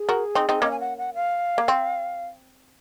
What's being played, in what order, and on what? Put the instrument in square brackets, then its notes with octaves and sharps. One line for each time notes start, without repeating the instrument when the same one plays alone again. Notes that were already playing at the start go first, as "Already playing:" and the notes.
Already playing: [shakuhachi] G#4
[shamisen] F#4 A#4
C4 D#4
C4 D#4
[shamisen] A#3 C#4 [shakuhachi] D#5
[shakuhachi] G#5
F#5
F#5
F5
[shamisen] A#3
C4